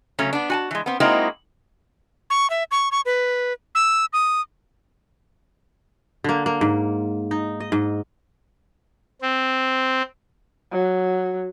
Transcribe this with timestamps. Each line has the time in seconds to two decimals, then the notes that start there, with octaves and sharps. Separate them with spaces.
0.19 C#3 F#3 A3 C#4
0.33 B3 D4
0.50 F#4 G#5 A5
0.71 E3 G#3
0.86 B3 C4
1.00 G#3 A#3 C4 D#4 E4 F#4
2.30 C#6
2.50 E5
2.71 C#6
2.92 C#6
3.06 B4
3.75 E6
4.13 D#6
6.24 D3 A#3
6.46 A#3
6.61 G#2
7.31 D#4
7.60 D#5
7.72 G#2
9.22 C4
10.72 F#3